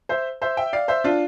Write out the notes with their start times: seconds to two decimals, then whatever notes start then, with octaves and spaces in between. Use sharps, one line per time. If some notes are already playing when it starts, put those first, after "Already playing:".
0.09 C5 E5
0.42 C5 E5
0.57 E5 G5
0.73 D5 F5
0.88 C5 E5
1.04 D4 F4